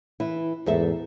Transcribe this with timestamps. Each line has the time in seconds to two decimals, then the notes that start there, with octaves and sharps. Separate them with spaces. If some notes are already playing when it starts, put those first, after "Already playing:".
0.20 E3 E4
0.66 E2 G#2 A4 E5